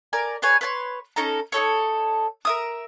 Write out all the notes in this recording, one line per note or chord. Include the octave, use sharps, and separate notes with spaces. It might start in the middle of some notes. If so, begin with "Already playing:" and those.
A#4 D5 G#5
G#4 B4 C#5 G#5
B4 C#5 G#5 C6
C#4 D#4 A4 A#5
D#4 G4 A4 C#5
A#4 E5 D#6